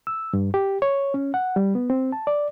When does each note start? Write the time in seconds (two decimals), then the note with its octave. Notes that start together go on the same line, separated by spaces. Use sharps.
0.07 E6
0.33 G2
0.54 G4
0.82 C#5
1.14 C#4
1.34 F#5
1.56 G3
1.75 B3
1.90 C4
2.12 A5
2.27 D5